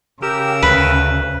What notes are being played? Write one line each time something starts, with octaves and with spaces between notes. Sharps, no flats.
C#3 G4 A#4 E6
D2 B4